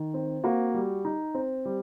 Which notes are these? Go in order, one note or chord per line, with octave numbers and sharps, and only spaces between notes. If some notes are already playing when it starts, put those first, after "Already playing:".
Already playing: D#3
C4
A#3 F#4
G3
D#4
C4
G3